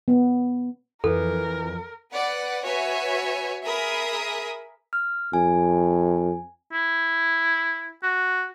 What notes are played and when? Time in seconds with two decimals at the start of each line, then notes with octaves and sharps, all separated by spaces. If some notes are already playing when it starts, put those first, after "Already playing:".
0.08 B3
1.04 F2 E3 A4 A#4
2.11 B4 D5 F#5
2.65 F#4 B4 C#5 E5 G#5
3.64 G#4 A#4 E5 B5 D#6
4.93 F6
5.33 F2 G#5
6.73 E4
8.03 F#4